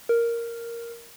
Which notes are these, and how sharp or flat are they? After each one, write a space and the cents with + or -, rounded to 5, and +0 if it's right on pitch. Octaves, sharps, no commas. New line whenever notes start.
A#4 +0